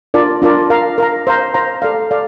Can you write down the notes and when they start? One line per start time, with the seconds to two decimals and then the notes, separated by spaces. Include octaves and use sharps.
0.14 D4 F4 A#4 D5 A5
0.42 D4 F4 A#4 D5 A5
0.70 A#4 F5 A#5
0.98 A#4 F5 A#5
1.27 C5 F5 A#5
1.54 C5 F5 A#5
1.82 A4 D5 F5
2.11 A4 D5 F5